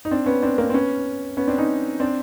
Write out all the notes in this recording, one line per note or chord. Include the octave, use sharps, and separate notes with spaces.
D#4
C4 D4
B3 C#4
C4 D4
A#3 C4
C4
B3 C#4
B3 C#4
C4 D4
C#4 D#4
C4 D4